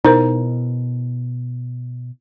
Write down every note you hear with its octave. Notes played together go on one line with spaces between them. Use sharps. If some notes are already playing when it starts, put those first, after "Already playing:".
B2 D#4 E4 A#4 C5